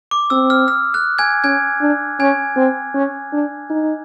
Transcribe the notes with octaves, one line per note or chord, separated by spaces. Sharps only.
D6
C4 E6
F6
F6
F#6
G#5 G#6
C#4 G#5 G#6
D4
C#4 G#5 G#6
C4
C#4
D4
D#4